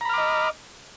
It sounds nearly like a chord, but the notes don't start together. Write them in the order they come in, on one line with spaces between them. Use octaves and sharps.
A#5 B5 F6 D6 D#5